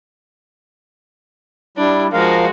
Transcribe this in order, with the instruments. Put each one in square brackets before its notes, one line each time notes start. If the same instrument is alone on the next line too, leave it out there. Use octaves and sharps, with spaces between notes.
[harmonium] G3 E4 [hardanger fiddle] D4
[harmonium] F3 A#4 F5 [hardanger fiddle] G#3 F#4